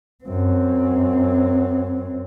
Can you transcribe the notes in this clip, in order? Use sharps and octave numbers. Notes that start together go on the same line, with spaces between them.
F#2 C4